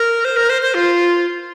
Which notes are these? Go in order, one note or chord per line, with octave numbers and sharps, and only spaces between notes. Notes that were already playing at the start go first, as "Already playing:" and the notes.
Already playing: A#4
C5
A#4
C5
C5
F4